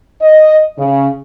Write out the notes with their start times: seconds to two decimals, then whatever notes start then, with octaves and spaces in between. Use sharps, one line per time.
0.21 D#5
0.78 C#3